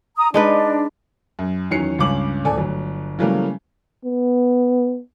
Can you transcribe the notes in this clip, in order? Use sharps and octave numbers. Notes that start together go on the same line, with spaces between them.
A#5 D#6
G#3 D4 D#4 B4
F#2
E2 D#3 F#3 C#4 C7 C#7
C#2 G2 C#3 C#4 D6 F#7
D1 A4 D5 G#5
G1 F#3
C#3 E3 F#3 G3 A3 A#3
B3